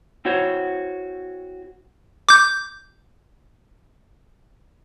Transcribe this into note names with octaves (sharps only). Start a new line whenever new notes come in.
C4 E4 F#4 C5 C#5
D6 G6